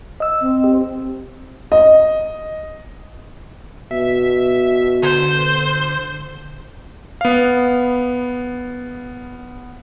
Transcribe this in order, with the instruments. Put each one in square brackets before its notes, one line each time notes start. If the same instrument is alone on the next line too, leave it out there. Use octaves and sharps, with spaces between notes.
[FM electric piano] D#5 E6
[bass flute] C4
[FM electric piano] G4
[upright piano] D#5
[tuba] B2 [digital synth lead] E5
[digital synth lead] D3 [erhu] C5
[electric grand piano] B3 F5